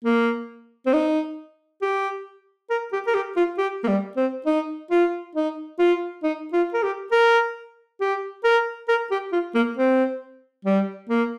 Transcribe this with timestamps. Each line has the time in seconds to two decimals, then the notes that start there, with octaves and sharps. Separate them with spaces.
0.05 A#3
0.86 C4
0.94 D#4
1.82 G4
2.70 A#4
2.93 G4
3.07 A#4
3.15 G4
3.36 F4
3.58 G4
3.84 A#3
3.88 G3
4.17 C4
4.47 D#4
4.91 F4
5.35 D#4
5.79 F4
6.24 D#4
6.53 F4
6.74 A#4
6.83 G4
7.12 A#4
8.01 G4
8.44 A#4
8.89 A#4
9.11 G4
9.32 F4
9.55 A#3
9.77 C4
10.65 G3
11.10 A#3